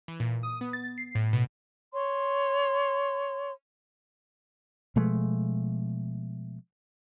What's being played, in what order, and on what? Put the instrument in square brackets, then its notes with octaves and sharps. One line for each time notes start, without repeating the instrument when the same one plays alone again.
[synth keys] E3
A#2
D#6
B3
A6
C7
A2
B2
[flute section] C#5 C6
[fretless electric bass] B2 F3 G#3 A3